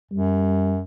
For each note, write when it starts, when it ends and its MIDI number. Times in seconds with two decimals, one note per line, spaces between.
0.11 0.83 42
0.11 0.78 55